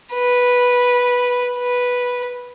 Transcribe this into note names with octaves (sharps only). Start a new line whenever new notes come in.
B4
B4